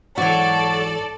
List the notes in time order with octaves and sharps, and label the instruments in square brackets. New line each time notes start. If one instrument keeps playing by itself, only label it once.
[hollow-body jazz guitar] G#2 E3 [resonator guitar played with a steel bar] F#3 F#4 [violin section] A4 D5